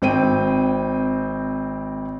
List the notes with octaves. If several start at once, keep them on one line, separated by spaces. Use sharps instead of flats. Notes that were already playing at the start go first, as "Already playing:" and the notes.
G#1 C4 G5 D#7